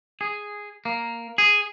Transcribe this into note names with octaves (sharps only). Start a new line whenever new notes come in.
G#4
A#3
G#4